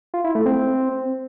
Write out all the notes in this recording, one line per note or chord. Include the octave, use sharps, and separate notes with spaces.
F4
E4
A3
C4